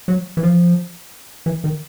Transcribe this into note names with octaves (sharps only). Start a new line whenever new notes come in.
F#3
E3
F3
E3
D#3